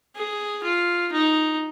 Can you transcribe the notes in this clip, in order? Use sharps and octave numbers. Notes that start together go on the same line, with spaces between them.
G#4
F4
D#4